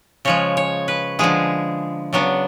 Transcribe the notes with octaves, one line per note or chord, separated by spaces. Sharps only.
C#3 F3 G#3 C#5
C#5
B4
D3 F3 G#3 G#4
C#3 F#3 B3 D4